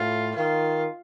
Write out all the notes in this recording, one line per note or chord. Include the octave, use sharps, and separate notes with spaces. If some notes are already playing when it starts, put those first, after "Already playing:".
Already playing: A2 F4
D#3 F4